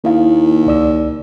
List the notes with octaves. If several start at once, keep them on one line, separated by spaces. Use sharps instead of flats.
D#2 A#3 E4 F5
C#2 D5 E6